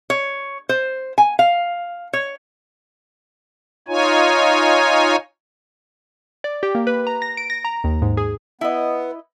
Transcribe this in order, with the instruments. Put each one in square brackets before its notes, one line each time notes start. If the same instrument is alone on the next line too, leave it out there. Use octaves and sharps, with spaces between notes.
[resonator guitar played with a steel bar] C#5
C5
G#5
F5
C#5
[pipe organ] D#4 F4 C#5 G#5
[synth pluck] D5
G4
A#3
B4
A#5
A#6
D7
A#6
A#5
D#2
G#2
G#4
[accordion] B3 [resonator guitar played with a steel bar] E4 D#5